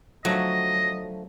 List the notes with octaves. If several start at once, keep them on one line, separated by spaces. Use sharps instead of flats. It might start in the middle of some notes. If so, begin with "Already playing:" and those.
D3 F3 F#3 A3 D#5